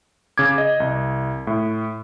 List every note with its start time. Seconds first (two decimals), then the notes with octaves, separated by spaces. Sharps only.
0.38 C#3 D6 G#6
0.58 D#5
0.80 C2
1.47 A2